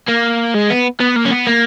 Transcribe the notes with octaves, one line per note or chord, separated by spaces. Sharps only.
A#3
G#3
B3
B3
A#3
C#4
B3
A#3